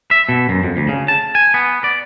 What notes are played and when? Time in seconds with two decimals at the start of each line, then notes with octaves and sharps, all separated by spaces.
0.11 E5
0.29 B2
0.49 F#2
0.63 F2
0.77 D2
0.89 C#3
1.08 A5
1.35 G#5
1.54 B3
1.84 D5